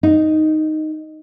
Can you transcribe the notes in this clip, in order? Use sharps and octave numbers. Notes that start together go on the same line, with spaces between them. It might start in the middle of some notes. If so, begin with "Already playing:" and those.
D#4